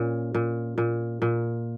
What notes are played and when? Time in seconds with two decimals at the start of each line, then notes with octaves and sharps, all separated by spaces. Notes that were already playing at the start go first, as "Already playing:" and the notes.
Already playing: A#2 C#4
0.34 A#2
0.78 A#2
1.22 A#2